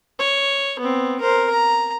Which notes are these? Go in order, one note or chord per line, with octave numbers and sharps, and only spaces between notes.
C#5
B3 C4
A#4 C5
A#5